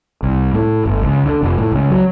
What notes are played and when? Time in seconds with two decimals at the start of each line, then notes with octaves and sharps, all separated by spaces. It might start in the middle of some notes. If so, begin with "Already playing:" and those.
0.23 C2
0.54 A2
0.86 G1
1.02 C#2
1.26 D3
1.42 F1
1.58 A2
1.72 C#2
1.91 F#3